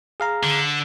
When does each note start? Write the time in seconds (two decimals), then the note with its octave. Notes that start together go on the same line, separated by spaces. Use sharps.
0.20 G#4 F5 A#5
0.43 D3